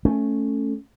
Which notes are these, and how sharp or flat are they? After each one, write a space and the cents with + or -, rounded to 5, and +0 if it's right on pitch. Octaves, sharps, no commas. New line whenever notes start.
A3 +0 C#4 +0